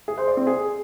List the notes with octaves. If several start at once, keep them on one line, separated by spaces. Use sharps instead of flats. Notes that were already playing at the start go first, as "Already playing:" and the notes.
G#4
C5
D5
C4
G#4